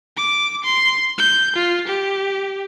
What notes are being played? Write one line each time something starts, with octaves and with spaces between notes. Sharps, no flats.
D6
C6
G6
F4
G4